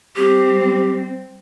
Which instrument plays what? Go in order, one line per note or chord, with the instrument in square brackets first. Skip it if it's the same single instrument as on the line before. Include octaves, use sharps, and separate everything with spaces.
[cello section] G3 C4 [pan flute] G4